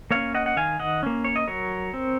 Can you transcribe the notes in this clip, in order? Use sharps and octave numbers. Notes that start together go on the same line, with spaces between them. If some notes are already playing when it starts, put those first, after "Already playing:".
A#3 C#4 C#5 F5
D#5 F#5
F#5
D#3 F5 G#5
D#5 F#5
A#3 C#4
C#5
D#5
F#3 A#4 C#5
C4